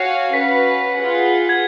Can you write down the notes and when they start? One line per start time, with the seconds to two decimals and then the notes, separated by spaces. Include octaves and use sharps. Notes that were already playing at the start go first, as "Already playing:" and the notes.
Already playing: F#4 C#5 F5 G#5
0.33 C#4 F#4 B4 F5 B6
0.96 F4 G#4 B4 F#5
1.49 G#6